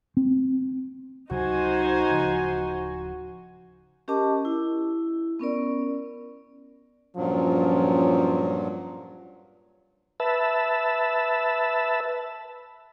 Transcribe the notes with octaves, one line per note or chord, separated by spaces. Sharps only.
C4
C#2 C3 F#3 D#4 F#4 C5 G#5
D1 C#3 F3
C#4 G4 A#4 D#5 A5 D6
E4
B3 C#4 A#4 D5
G2 A#2 F3 F#3 C#4
B4 E5 A5